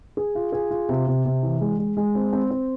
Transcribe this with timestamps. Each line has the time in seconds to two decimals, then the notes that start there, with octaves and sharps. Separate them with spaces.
0.17 G#4
0.35 F4
0.52 G#4
0.71 F4
0.89 C3
1.07 C3
1.25 C3
1.43 E3
1.61 G#3
1.79 G#3
1.97 G#3
2.15 C4
2.33 C4
2.50 C4